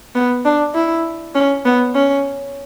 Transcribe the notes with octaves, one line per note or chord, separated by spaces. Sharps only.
B3
D4
E4
C#4
B3
C#4